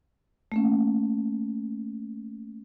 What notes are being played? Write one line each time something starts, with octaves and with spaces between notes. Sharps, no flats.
A3 A#3 C#4